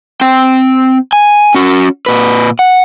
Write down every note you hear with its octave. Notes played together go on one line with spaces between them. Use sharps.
C4 G5
G#5
C#4 F#4
A#2 B4
F#5